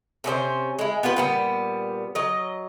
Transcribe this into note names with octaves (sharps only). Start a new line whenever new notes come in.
C3 C#4 E4 C5
G#3 E4
B3 F4 G4 B4
A#2 G3 B3
F#3 D#5